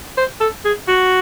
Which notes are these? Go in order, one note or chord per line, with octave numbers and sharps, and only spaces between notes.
C5
A4
G#4
F#4